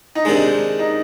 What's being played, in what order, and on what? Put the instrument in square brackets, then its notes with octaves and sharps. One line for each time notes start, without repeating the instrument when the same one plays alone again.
[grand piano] D#4
[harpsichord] C3 D#3 G#3 [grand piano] D4
[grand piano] D#4